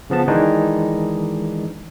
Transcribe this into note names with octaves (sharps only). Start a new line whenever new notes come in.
C#3 F3 B3 A5
D#3 E3 G#3 D4 D#4